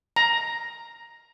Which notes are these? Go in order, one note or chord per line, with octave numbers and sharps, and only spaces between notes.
A#5